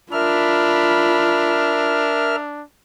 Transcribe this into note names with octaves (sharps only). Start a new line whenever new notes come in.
D4 F4 A#4 E5 B5 F6